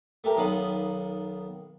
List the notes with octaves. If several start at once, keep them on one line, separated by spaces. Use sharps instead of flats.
A3 G4 A#4
B1 D#3 B3 F5 B5